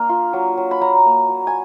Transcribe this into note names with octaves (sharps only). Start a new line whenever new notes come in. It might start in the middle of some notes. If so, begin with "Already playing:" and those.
Already playing: A#3 D4 F5
F4
F#3
F#3
B5
F#3 A#5
A#3
F#3
G#5